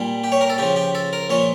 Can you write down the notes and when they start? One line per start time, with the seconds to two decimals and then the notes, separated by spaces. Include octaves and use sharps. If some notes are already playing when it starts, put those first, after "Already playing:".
Already playing: A#2 G3
0.24 G4
0.32 C#5
0.41 A#4
0.50 A4
0.58 C#3 F3 G4
0.76 G4
0.95 A4
1.13 A#4
1.30 A#2 F3 C#5